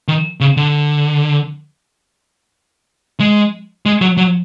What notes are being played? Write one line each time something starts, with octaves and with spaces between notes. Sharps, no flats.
D#3
C#3
D3
G#3
G#3
F#3
F#3